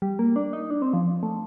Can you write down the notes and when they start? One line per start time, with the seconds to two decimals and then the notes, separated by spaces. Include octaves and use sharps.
0.02 G3
0.19 A#3
0.36 D4
0.53 D#4
0.70 D4
0.82 C4
0.93 F3
1.23 A3